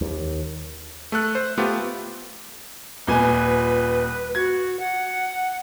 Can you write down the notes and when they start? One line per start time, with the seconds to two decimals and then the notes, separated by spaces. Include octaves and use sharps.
0.01 D#2
1.12 A3 A4 F#6
1.35 C5
1.58 A3 B3 F4 G4
3.07 D#1 A#2 B4 G#5
4.35 F#4 G#6
4.80 F#5